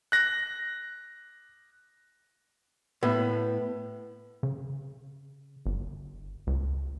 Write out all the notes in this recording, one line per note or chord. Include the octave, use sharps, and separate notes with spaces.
F#6 A#6
A2 B3
C#3
G1
C#2